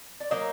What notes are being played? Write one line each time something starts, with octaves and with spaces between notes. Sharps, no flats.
D5
F#3 A#3 D#4 D#5